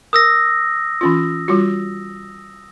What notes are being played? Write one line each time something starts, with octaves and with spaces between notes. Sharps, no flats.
A#4 D#6 E6 A#6
E3 C#4 F4
G3 F4 F#4